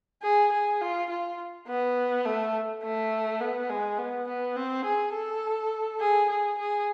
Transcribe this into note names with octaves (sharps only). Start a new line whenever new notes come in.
G#4
G#4
F4
F4
B3
A3
A3
B3
G#3
B3
B3
C4
G#4
A4
G#4
G#4
G#4